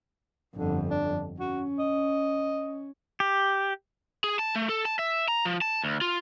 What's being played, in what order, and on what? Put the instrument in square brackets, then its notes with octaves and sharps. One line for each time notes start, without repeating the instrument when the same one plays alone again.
[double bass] G1 F2 [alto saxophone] D3
[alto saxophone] D4
[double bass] C#4 [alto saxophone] F#4
[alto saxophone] D#5
[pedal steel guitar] G4
[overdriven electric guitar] G#4
A5
A3
A4
A5
E5
A#5
F3
A5
D2
F4